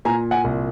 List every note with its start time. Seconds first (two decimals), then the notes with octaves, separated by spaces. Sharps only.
0.05 A#2 G#5 A#5
0.31 F#5 G#5
0.44 C2